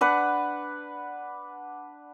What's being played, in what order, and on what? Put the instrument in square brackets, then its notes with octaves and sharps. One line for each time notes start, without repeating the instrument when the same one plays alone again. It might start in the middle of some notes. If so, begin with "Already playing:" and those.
[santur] D4 B4 F#5